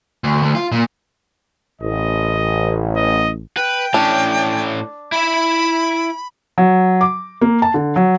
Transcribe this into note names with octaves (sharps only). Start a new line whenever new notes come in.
D2
D2
F4
A#2
A1 D#5
D#5
B4 G5
A2 C#4 D4
E4 E5 B5
F#3
D6
A#3
A5
D3
F#3